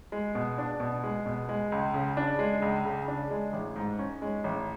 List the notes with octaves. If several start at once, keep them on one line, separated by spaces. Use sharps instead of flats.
G#3
B2
D4
B2
G#3
B2
G#3
C#2
C#3
D4
G#3
C#2
C#3
D4
G#3
A1
G#2
C#4
G#3
A1